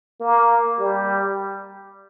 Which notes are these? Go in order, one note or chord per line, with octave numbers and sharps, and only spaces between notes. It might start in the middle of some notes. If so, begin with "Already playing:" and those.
A#3
G3